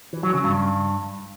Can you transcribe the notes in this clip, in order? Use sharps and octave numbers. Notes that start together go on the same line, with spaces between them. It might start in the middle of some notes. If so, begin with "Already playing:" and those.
E3
F#3
C#3
G2